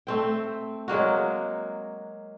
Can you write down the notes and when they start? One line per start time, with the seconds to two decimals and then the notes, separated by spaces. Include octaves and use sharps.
0.07 A3 C4 G5
0.88 F#3 G#3 A#3 F#4